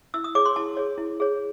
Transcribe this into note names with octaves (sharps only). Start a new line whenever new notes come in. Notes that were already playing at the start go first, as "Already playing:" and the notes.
E4 E6
D#6
G#4 C#5 D6
C6
E4 A5
G#4 C#5
E4
G#4 C#5